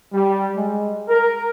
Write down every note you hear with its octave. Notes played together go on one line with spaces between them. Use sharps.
G3
G#3
A#4